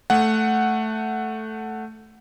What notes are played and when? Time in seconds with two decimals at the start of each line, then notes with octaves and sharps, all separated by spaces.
0.10 A3 F#5